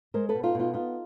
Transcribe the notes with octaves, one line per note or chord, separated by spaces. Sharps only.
G#3 A#4 C5
A4 B4
B2
D#4 F4
B2 D#4 F4
B3 D#4 F4